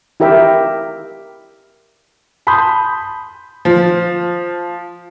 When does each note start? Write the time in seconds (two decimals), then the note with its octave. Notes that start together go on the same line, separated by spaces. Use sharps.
0.20 E4 G4 A#4 E5 G5
2.47 A5 B5 C6 D#6 G6
3.65 F3